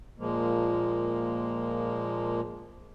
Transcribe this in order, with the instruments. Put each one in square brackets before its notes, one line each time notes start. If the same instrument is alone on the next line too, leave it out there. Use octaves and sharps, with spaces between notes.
[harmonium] A#2 F3 G#3 A#3